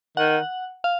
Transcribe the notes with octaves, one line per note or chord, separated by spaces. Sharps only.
D#3 F#5
F5